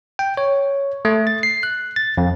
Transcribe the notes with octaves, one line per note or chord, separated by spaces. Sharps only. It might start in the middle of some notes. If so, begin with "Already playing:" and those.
G5
C#5
A3
A6
C7
F#6
A6
F2